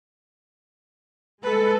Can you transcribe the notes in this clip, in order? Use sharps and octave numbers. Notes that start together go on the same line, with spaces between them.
G#3 A4 B4